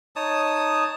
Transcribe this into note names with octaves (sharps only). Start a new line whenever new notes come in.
D#4 C#5 A5 D#6